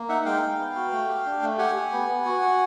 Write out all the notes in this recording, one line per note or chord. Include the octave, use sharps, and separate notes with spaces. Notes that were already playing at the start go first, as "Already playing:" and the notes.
Already playing: A#3
D#4 E5 F#5
G#3 F5 G5
D#4
B3
F#4
A3
G4
D4
A3
G4 F#5 G#5
G4
B3
B3
F#4
F#4